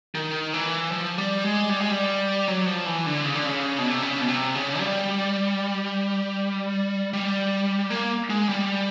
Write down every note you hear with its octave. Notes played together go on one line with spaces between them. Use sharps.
D#3
E3
F3
G3
G#3
G3
G#3
G3
F#3
F3
E3
D3
C#3
D3
C#3
B2
C3
C#3
B2
C3
C#3
G3
G3
A#3
G#3
G3